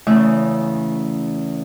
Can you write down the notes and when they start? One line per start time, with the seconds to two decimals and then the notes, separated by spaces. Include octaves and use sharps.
0.07 E2 C#3 A3 E5